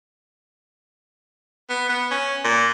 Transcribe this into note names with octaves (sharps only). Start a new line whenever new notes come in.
B3
B3
C#4
A#2